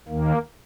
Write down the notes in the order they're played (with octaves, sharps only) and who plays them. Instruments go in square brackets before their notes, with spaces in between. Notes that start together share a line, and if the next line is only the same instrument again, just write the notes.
[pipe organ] D#2 D#3 A#3